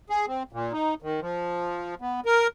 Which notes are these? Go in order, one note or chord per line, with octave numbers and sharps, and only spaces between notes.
G#4
C4
A#2
D#4
D#3
F3
B3
A#4